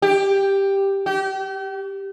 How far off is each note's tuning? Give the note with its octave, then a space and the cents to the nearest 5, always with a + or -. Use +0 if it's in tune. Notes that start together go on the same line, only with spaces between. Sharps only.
G4 +5
G4 -35